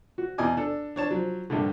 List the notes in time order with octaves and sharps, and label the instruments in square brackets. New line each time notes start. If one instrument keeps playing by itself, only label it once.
[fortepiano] F#4
E2 B2 D#5 G#5 D6
D4 A4
D4 C#5 A5
F3 F#3
A#1 G2 D3